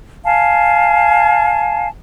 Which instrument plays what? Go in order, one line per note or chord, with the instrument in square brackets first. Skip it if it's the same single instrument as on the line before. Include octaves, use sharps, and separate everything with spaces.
[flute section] F5 G#5 A5